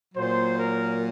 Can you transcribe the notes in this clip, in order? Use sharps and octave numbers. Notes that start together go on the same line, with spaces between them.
A#2 F#3 C5
A#4